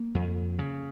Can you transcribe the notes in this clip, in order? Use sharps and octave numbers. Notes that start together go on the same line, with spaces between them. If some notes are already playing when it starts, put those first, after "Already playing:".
Already playing: A#3
F2
C#3